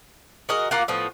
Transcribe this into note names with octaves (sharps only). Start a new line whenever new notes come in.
F#4 G#4 A#4 D#5
A#3 F4 F5 F#5
A2 F3 B3